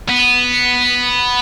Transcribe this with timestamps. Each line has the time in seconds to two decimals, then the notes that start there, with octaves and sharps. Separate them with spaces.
0.09 B3